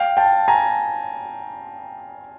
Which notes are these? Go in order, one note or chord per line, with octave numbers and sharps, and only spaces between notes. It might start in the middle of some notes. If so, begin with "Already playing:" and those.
Already playing: F5 G5
G5 A5
G#5 A#5